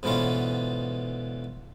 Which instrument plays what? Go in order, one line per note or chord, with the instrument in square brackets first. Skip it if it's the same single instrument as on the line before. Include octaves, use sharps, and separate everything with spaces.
[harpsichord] G#2 B2 D3 E3 C#4 F4